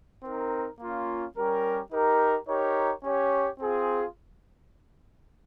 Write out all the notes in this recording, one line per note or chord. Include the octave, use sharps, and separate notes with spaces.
C4 D#4 A#4
A#3 C#4 F4
G3 C#4 G4 A#4
D#4 G4 A#4
D#4 G4 A#4 C#5
C#4 G4 C#5
C4 F4 G#4